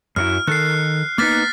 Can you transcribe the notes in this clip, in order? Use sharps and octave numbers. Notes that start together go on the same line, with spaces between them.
F#2 F#3 E4 F6
D#3 A4 A#4 F#6 C7
A#3 B3 D#4 F6 A6 B6